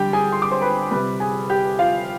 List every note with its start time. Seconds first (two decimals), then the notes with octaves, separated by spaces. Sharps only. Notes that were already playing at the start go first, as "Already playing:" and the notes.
Already playing: D3 G3 G4 G5
0.13 G#4 G#5
0.32 C6
0.42 D6
0.51 C5 C6
0.62 B4 B5
0.91 G3 B4 B5
0.96 C3
1.20 G#4 G#5
1.50 G4 G5
1.79 F4 F5